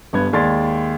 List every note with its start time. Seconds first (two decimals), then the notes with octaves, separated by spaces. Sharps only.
0.13 G1 G2 B3 G#6
0.33 D#2 G#3 D5 C6 A6